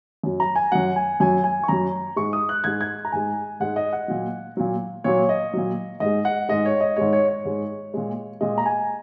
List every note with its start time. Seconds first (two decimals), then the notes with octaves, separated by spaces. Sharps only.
0.23 F#2 F#3
0.40 A#5
0.56 G#5
0.72 F#2 F#3 F#5
0.96 G#5
1.20 F#2 F#3 G#5
1.44 G#5
1.63 C#6
1.68 F#2 F#3 A#5
2.16 G#2 G#3 C#6
2.33 D#6
2.49 F#6
2.64 G#2 G#3 G#6
2.81 G#6
3.05 A#5
3.12 G#2 G#3 G#5
3.60 G#2 G#3 F#5
3.76 D#5
3.93 F#5
4.08 A#2 F#3
4.57 A#2 F#3
5.04 A#2 F#3 C#5
5.29 D#5
5.53 A#2 F#3
6.00 G#2 D#5
6.06 G#3
6.25 F#5
6.49 G#2 G#3 D#5
6.65 C#5
6.80 D#5
6.96 G#2 G#3 C#5
7.13 C#5
7.28 C#5
7.45 G#2 G#3
7.94 A#2 G#3
8.41 A#2 G#3 D#5
8.58 A#5
8.66 G#5